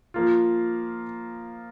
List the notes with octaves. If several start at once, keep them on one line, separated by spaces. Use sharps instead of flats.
F3 A#3 F4